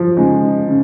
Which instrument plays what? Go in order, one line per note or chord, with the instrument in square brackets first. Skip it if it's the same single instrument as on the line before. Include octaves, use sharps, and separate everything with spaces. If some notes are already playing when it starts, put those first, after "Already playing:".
Already playing: [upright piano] F3
[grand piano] C#3 G#3 D#4
C#3